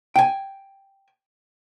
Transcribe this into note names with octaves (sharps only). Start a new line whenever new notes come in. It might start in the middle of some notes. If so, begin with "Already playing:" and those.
G5 G#5